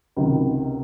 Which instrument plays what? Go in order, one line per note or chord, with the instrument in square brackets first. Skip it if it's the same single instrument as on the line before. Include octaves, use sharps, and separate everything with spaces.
[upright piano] C#2 C3 D#3 F#3